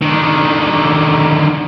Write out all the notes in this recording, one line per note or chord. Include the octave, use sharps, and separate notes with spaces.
D3 D#3